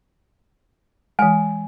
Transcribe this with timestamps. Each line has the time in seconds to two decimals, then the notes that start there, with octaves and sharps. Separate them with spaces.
1.19 E3 G#3 G#5